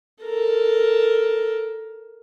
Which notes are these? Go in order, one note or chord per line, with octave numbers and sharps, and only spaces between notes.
A4 A#4